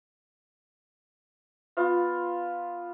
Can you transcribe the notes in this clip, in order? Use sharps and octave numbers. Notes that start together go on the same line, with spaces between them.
B3 F4